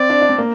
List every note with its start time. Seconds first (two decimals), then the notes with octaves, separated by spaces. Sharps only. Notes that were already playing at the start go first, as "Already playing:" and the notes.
Already playing: C4 D5
0.10 D4
0.21 D4
0.29 C4
0.38 A#3